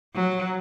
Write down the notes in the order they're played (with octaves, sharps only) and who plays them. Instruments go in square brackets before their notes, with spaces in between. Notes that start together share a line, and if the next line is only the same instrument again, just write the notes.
[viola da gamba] F#3